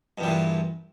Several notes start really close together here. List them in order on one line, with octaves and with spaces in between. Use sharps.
G2 E2 G3 A#2 E3